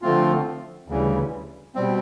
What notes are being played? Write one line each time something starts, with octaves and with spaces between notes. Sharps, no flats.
D3 F3 A3 C4 F4
D2 C#3 E3 G3
B2 G3 C4